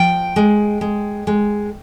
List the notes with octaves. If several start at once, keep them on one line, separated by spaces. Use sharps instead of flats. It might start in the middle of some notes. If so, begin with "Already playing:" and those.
Already playing: F3 G5
G#3
G#3
G#3